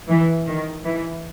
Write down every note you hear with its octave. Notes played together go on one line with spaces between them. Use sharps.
E3
D#3
E3